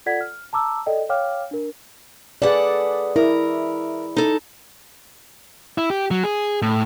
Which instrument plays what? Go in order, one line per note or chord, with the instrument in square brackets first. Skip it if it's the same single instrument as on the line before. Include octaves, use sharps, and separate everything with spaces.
[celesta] F4 A4 D5 F#5 G#6 B6
F6
A5 A#5 D6 E6
A4 D5 D#5 G5
C#5 F5 G5 D6 F6
D4 A#4
[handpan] G#4 D5 [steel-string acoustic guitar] A4 B4 F#5
[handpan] E4 [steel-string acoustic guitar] A#4
[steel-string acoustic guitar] D#4 A4
[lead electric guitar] E4
G4
F#3
G#4
A2